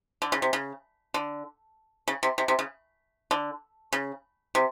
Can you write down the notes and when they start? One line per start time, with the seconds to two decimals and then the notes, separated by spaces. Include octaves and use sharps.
0.22 D3
0.32 C#3
0.42 C3
0.53 C#3
1.14 D3
2.08 C#3
2.23 C3
2.38 C3
2.48 C3
2.59 C#3
3.31 D3
3.93 C#3
4.55 C3